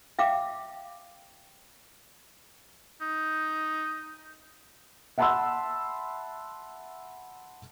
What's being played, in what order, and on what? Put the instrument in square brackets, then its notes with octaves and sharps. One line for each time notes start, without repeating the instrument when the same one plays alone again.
[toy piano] E5 F5 G5 D6
[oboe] D#4
[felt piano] E5 F#5 A5 B5 C6 E6